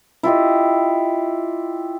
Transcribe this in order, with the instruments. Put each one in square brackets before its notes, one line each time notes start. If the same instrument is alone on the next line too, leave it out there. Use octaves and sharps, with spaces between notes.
[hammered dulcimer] E4 F4 G4 D#5